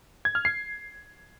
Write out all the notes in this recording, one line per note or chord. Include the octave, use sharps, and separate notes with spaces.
G#6
F6
C7